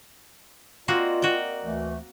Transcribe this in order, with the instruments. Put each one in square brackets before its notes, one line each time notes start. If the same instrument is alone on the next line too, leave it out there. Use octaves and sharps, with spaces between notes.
[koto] A#3 C4 F#4 [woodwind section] F4 [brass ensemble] A#4 D5 D#5
[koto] F#4 G5
[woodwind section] D2 E3 A3